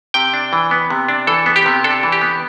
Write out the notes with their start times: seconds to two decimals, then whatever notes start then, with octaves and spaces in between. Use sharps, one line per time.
0.14 C3 G5
0.34 D4
0.53 E3
0.71 B3
0.90 C3
1.08 D4
1.27 E3 A4
1.46 B3
1.56 G4
1.66 C3
1.84 D4 A4
2.03 E3
2.12 G4
2.21 B3